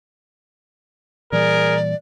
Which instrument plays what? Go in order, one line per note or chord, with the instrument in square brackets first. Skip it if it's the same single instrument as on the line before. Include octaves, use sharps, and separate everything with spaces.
[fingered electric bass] A#2 E3 G3 [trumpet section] G#4 A#4 [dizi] D5